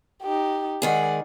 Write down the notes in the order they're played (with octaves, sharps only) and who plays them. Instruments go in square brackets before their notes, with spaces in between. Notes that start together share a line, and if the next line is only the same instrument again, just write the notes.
[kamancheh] D#4 G4
[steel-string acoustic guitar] G#2 D#3 G#4 [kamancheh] D5 F#5